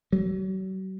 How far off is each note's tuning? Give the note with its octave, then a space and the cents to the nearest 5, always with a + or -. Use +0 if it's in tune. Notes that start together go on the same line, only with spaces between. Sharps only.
F#3 +40